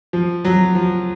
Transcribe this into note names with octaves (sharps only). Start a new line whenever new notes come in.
F3
F#3
F3